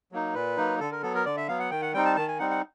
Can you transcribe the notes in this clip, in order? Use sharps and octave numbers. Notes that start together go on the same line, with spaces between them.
F#3 A#3 D#4
A#2 B4
F#3 A#3 D#4
D3 A4
A#4
F#3 B3 A4
A#4
D3 D5
E5
F#3 B3 F5
F#5
D#3 G5
F#5
G3 C4 D#4 G5
A5
D#3 A5
G#5
G3 C4 D#4 F#5
F#5